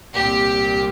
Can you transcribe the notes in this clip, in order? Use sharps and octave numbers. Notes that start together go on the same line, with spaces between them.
C2 A#2 G4